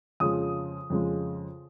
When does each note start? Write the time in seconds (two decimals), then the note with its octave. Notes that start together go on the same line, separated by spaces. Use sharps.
0.20 F2 C#3 F3 G#3 D#6
0.90 F2 C#3 F3 G#3